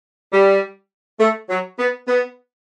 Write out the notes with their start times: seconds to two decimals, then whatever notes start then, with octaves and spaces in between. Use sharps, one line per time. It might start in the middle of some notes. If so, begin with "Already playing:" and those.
0.32 G3
1.20 A3
1.49 F#3
1.78 B3
2.07 B3